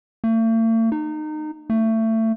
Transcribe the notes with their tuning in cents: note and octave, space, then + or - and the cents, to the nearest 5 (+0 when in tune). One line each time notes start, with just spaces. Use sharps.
A3 +45
D#4 -25
A3 +25